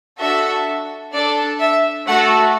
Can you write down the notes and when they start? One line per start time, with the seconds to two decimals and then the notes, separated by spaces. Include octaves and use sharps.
0.18 D4 F#4 A4 E5
1.12 D4 A4 D5
1.60 E5
2.07 A3 F#4 A4 F#5